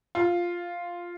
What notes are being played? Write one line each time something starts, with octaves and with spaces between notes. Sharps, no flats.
F4